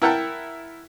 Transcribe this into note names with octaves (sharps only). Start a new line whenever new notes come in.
E4 A#4 F#5 G5 A5